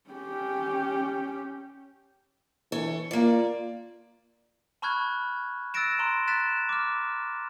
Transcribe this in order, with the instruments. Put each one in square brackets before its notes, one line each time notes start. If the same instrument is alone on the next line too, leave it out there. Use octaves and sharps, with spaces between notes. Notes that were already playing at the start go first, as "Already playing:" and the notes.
[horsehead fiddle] C#4 G4
[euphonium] E3 [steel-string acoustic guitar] A4 C#5
[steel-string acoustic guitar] A#3 D5 [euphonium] F4
[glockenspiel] A5 B5 C#6 F6 F#6 G#6
E6 F#6 A6 A#6 D7 E7
A#5 C6
F#6 A6 B6 E7
D6 F6